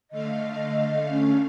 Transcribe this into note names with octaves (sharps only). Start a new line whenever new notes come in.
D3 A3 D#5 F5
C#4